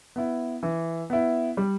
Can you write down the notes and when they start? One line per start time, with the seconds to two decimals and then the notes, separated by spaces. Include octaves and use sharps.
0.16 B3 E4
0.63 E3
1.10 B3 E4
1.57 G3